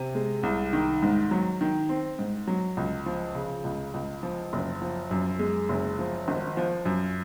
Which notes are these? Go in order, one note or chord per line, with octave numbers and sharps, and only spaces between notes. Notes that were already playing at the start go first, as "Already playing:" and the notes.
Already playing: C3
G#3
C2
D#3
G#2
F#3
D#3
C4
G#2
F#3
C#2
F3
C#3
C#2
C#2
F3
F#1
F3
F#2
G#3
F#1
F3
G#1
F3
F#2